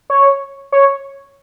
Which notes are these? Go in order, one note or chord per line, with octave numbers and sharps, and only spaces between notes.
C#5
C#5